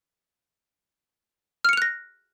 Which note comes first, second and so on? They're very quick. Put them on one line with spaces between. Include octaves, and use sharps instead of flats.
F6 C#7 F7 F#6 A#6